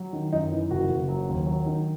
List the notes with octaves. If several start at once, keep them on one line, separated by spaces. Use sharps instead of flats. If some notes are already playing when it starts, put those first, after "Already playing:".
Already playing: F#3
D#3
F#2 D#4
E3
F#1 F#4
F#1
F#3
D#2
F#3
D#3